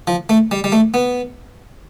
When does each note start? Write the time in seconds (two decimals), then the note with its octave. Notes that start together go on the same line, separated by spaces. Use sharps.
0.07 F3
0.29 A3
0.51 G3
0.64 G3
0.72 A3
0.94 B3